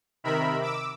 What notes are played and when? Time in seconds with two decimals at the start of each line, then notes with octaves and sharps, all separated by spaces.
0.24 C3 D#3 A#4 E5 B5
0.62 D6 E6